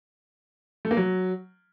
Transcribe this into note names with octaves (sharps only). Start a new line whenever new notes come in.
A3
A#3
F#3